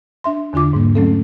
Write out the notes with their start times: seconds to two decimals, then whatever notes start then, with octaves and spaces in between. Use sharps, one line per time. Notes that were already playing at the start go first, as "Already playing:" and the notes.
0.24 D4 E5 C6
0.53 E2 D3 D4 F4 D6
0.73 G#2 G3 A#3
0.95 F#3 A3 C4 C#4 A4